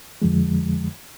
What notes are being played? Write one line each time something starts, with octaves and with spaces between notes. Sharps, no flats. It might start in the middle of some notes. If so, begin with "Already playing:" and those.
F2 D3 F3 G#3